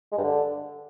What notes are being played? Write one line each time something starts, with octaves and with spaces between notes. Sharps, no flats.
G#3
G2
D3